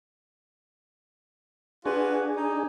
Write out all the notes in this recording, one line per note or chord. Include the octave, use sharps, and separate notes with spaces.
D4 F4 F#4 G#4 B4
D#4